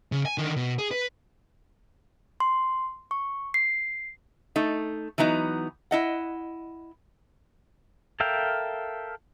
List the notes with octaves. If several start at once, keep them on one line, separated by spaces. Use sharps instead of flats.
C#3
G#5
D3 D#3
B2
G#4
B4
C6
C#6
C7
A3 D#4
E3 F#3 B3 D#4
E4 D#5 F#5
A4 A#4 E5 F5 G5